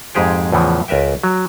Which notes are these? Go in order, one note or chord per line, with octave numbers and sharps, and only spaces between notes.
F2 G#2 G#3 G4 G#4 G5
E2 A2 C#3 E3 F3
C#2 A#4 B4 E5 G5
F#3